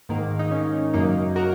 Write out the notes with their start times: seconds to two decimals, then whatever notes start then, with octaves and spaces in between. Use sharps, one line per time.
0.09 G#2 D#3 A#3
0.39 D#4
0.51 C#4
0.93 F#2 C#3 A#3 D#4
1.36 F#4 A#4